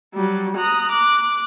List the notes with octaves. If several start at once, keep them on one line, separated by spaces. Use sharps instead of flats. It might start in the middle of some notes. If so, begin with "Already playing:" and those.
F#3 G3
A#5 D#6 F#6
D6 F#6